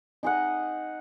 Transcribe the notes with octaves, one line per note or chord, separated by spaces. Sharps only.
D#4 G#4 D#5 F#5